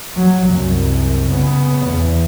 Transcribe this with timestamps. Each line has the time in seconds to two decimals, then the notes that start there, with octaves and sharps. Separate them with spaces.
0.16 F#3
0.46 C2 F#2
1.29 C#3 B3
1.86 E2